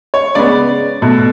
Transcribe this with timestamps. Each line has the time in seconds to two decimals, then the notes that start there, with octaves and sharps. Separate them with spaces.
0.14 C#5
0.35 C#3 G#3 B3 D5
1.02 B2 A3